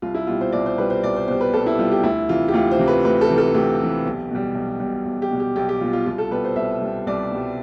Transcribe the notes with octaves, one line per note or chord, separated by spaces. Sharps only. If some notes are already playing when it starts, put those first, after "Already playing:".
C2 F4
E4
B2 G3 F4
C5
C2 D5
C5
B2 G3 B4
C5
C2 D5
C5
B2 G3 C5
B4
C2 A4
E4
B2 G3 F4
G4
D2 E4
C3 E3 F4
G4
D2 F4
C5
C3 E3
B4
D2 B4
A4
C3 E3
A4
D2 G4
C3 E3
B1
B2 G3
B1
B2 G3
B1
G4
B2 G3
G4
B1 G4
G4
B2 G3 F4
F4
C2 F4
A4
B2 G3 B4
C5
C2 E5
B2 G3
C2 D5
B2 G3